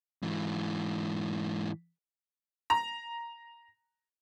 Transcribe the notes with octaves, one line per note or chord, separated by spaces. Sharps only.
G#2 E3
A#5